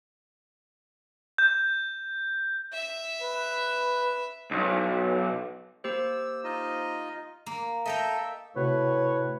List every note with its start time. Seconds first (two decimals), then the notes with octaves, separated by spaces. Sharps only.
1.38 G6
2.73 E5
3.22 B4
4.51 B1
5.84 A#3 G4 C5 E6
6.44 D#4 F4 D#5
7.46 A#3
7.86 A4 D#5 E5 G5 A#5
8.56 A2 C3 F#4 B4 C#5